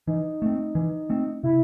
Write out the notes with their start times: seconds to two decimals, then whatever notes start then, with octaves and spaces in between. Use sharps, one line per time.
0.07 E3 D#4
0.42 A3 C4
0.75 E3
1.10 A3 C4
1.43 C3 E4